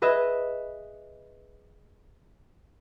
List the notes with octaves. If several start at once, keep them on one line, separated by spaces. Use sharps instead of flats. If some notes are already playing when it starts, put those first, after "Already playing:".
G#4 B4 D#5 E5